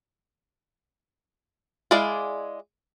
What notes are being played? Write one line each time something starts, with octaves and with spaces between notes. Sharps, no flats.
G#3 E4 G#4 D5 F5